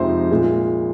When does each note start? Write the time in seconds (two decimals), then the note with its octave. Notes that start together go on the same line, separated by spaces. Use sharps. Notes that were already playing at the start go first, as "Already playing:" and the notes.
Already playing: F2 C3 F3 G#3 D#4 C5
0.31 A#2 G#3